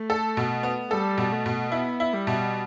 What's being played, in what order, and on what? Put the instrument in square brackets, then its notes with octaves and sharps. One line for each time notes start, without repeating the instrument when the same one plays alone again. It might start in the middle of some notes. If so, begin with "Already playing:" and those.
Already playing: [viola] A3
[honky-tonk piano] A4
B2
B3
[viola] G3 [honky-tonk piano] A4
[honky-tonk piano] B2
[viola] A3
[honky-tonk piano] B2
[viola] B3 [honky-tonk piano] E4
[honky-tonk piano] E4
[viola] G3
[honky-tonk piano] B2